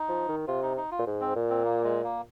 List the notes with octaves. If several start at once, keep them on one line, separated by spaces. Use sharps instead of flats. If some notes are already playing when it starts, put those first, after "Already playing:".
Already playing: D#4
F3
D#3
C3 F4
D#4
D#4
F4
A#2
G#2
C4
A#2
C4
A#3
G#3
A#3